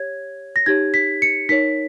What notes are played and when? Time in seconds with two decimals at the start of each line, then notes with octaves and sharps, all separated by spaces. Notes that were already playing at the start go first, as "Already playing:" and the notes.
Already playing: G4 C#5 G#6
0.56 A#6
0.66 D#4 G4 C#5 G#6
0.94 B6
1.22 C#7
1.49 D#4 A#4 C#5 B6